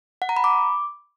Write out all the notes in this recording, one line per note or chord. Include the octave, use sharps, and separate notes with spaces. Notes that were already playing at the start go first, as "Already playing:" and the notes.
F#5
A#5
B5
D6